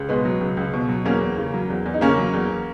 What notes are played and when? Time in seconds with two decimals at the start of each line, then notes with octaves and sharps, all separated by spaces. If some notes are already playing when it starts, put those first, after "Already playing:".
Already playing: C#2
0.09 B2 G#3 B3
0.25 F#3
0.41 C#2
0.57 C#2
0.73 B2
0.89 F#3
1.05 E2 A#3 C#4
1.21 E2
1.38 C#3
1.54 F#3
1.70 E2
1.86 E2
1.94 D#4
2.01 C#3 A#3 C#4
2.18 F#3
2.34 E2